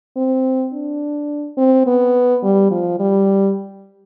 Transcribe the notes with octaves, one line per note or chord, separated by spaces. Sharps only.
C4
D4
C4
B3
G3
F3
G3